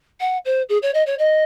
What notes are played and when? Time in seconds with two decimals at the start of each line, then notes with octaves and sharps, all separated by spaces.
0.20 F#5
0.45 C5
0.69 G#4
0.82 C#5
0.94 D#5
1.06 C#5
1.18 D#5